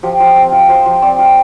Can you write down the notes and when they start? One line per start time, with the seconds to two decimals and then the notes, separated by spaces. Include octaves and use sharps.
0.03 F3 G4
0.20 F3
0.36 C4
0.52 F4
0.69 F3 C5
0.86 F3
1.02 C4 D5
1.19 F4